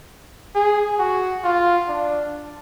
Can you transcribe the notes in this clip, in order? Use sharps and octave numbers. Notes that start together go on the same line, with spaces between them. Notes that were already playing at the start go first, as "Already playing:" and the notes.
G#4
F#4
F4
D4